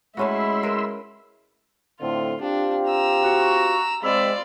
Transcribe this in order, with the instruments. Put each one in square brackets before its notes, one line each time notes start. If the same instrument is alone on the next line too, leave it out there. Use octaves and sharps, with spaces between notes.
[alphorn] G#3 [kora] A3 C#4 F#4 [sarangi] E4 [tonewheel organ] B5 C6 E6
[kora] A#4 B4
[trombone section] A2 D3 C4 [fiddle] F4
[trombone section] C4 F4 G4 [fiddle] D4
[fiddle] A#5 E6
[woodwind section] F#4
[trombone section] G#3 C4 [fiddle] F4 D5 [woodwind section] B5 E6